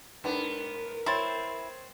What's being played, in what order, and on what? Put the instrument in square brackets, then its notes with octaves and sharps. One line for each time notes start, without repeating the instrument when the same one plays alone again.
[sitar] G#2 B3 [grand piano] D4 [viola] A#4
[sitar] C4 [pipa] E4 [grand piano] C#5 C6 A6